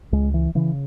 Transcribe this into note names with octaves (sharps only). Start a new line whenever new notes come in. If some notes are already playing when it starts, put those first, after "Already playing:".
C#2 G#3
E3
C#3 E3